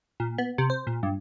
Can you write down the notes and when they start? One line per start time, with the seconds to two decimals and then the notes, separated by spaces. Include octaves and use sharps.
0.20 A#2
0.38 B3
0.58 C3
0.70 C5
0.87 A#2
1.03 G2